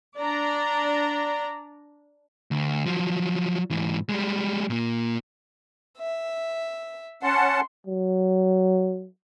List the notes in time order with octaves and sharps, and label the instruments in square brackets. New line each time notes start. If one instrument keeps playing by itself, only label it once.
[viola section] D4 D5 A#5
[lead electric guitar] D2
F3 F#3
G#2 E3
G3 G#3
A#2 A#3
[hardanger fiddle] E5
[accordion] C#4 F#5 A5 [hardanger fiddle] C6
[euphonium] F#3